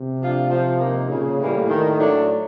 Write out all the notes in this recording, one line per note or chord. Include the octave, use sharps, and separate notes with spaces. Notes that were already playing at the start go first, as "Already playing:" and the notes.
Already playing: C3
F3 A3 D4 F4
F3
A#3 D#4
A#2 C#3
A2 E3 G3 A#3
D#3
F#3 A3 D4